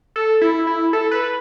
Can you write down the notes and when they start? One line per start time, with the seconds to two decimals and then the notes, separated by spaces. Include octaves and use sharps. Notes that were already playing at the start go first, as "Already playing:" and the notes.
0.16 A4
0.41 E4
0.67 E4
0.93 A4
1.11 B4